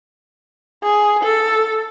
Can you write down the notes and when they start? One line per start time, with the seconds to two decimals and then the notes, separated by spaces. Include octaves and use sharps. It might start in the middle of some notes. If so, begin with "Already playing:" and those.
0.83 G#4
1.23 A4